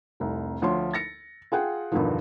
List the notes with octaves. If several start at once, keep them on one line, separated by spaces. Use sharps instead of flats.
F1 C2
D2 F3 C#5 C6
A6 A#6 C#7
F4 G#4 F#5 G5
E2 G2 B2 D3 D#3 F3